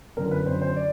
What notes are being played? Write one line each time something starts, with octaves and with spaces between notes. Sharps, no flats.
F#2 D3 F#3 A#4
B4
F#2 D3 F#3 C5
C5
D5